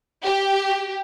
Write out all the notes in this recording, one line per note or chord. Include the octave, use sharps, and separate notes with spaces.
G4